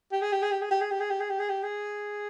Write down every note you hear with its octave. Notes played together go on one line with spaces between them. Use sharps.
G4
G#4
G4
G#4
G4
G#4
G4
G#4
G4
G#4
G4
G#4
G4
G#4
G4
G#4